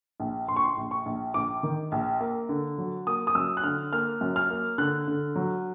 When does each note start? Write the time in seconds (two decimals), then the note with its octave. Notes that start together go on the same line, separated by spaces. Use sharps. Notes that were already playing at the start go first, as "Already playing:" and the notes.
0.20 A#1
0.48 A#1 C6
0.56 C#6
0.64 C6
0.77 A#1
0.91 C#6
1.06 A#1
1.34 A#1 D6
1.63 D#3
1.92 A#1
2.21 A#3
2.49 D3
2.78 F#3
3.07 A#3 D#6
3.27 D#6
3.35 F#2 E6
3.57 F#6
3.64 D3 F6
3.93 A#3 F6
4.21 F#2
4.36 F6
4.50 A#3
4.78 D3 F#6
5.08 D3
5.36 F#3